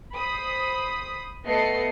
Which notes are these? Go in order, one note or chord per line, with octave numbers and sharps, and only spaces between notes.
C5 B5 D#6
A3 B3 A4 D#5 C7 C#7